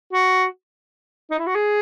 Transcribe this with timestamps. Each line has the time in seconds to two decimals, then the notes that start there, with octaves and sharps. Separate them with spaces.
0.13 F#4
1.31 D#4
1.39 E4
1.47 F#4
1.55 G#4